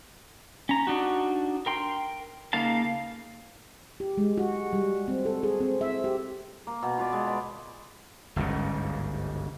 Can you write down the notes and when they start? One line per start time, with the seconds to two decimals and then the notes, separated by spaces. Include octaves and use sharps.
0.69 C#4 A#5
0.87 D4 D#4 F#4
1.66 A#4 G5 C6
2.53 C#3 A#3 D#4 F5 A5
4.00 G4
4.18 G#3
4.38 F#4
4.73 G3
5.08 C4
5.25 A4
5.43 G#4
5.60 C4
5.81 E5
6.04 G4
6.67 A#3
6.83 B2
6.98 F4 B4 D5
7.13 G#3
7.26 B4
8.36 G1 C#2 G#2 C#3